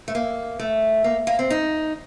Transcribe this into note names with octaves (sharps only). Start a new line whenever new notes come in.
A3
A#3
A3
A#3
A#3
C4
D#4